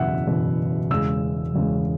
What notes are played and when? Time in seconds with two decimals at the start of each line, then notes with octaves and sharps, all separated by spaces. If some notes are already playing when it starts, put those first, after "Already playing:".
Already playing: F#1 E2 B2 E5 F#5
0.27 F#1 E2 B2
0.90 E1 E2 C#3 G#3 E6
1.53 E1 E2 C#3 G#3